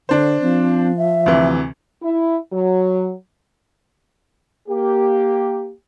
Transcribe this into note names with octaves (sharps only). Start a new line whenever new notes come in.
D3 D4 C5
F3 C4
E5
D2 C3 E3
E4
F#3
A#3 G4